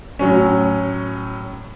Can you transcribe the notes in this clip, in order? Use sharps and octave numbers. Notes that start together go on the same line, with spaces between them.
A2 F#3 C#4